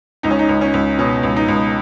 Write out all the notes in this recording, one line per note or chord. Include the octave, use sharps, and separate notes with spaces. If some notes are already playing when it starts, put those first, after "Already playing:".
C#2 D#4
C#4
D#4
C#2
C#4
C#2
B2 C#4
C#2
D#4
C#2